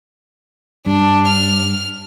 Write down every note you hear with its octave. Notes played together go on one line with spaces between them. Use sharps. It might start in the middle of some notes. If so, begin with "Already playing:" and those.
G2 D4
F6